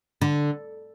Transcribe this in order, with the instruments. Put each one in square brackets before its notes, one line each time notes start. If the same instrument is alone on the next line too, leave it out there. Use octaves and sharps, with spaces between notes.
[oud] D3